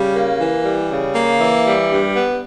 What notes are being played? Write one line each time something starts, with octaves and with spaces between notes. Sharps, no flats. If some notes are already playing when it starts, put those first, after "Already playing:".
Already playing: C#3 G3
A#3
E3
G3
C#3
A#3
E3
G3
G2
B3